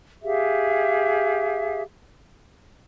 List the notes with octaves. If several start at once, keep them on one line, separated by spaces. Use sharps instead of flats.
G4 G#4 E5 F5